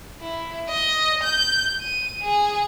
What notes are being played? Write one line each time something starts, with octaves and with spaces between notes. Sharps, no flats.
E4
D#5
G6
D#7
G#4